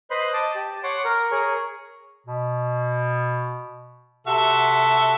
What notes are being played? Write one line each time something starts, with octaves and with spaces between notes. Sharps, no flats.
B4 C5 D#5 B5 C6
D#5 A5 D6
G4 A5
C#5 F#5 C6 D6
A#4
G#4 A#4 C#5
B2
C3 F#4 A4 E5